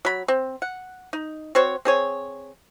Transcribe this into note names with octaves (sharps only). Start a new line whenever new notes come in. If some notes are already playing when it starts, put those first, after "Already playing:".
F#3 B5
C4
F#5
D#4
C4 F#4 C5 C#5
C4 G#4 C#5